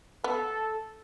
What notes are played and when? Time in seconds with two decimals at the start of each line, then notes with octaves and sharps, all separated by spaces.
0.24 B3 A4